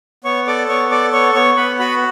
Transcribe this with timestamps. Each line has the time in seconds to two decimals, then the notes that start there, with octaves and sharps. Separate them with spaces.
0.24 B3 C#5 C#6
0.47 A4 D5 D6
0.68 B3 C#5 C#6
0.91 A4 D5 D6
1.13 B3 C#5 C#6
1.35 B3 C#5 C#6
1.57 B3 B4 B5
1.79 F#4 B4 B5